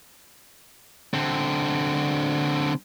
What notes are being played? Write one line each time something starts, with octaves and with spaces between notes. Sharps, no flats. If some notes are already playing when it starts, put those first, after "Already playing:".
D3 C4